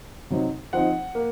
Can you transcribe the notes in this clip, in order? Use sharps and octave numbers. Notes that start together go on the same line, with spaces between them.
C3 F#3 C4 D#4
F3 C4 D#4 F#5
A#3